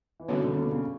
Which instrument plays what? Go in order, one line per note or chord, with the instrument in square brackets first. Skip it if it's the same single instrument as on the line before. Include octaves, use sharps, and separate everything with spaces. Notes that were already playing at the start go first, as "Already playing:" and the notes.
[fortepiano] E3
[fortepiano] B2 D3 [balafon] G3 C#4 F#4 C#5
[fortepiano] B2 D3
C#3
B2 D3
C#3